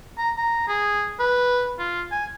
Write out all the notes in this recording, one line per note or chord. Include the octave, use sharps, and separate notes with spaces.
A#5
A#5
G#4
B4
F4
G#5